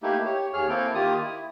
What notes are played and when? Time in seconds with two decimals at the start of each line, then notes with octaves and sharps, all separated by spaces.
0.03 A3 A#3 D#4 E4 G4
0.26 G4 C#5
0.54 D#2 G#4 C#5 F6
0.69 A#3 C4 E4 A4 G5
0.95 D#3 A#3 F4 G4 D#6
1.22 E4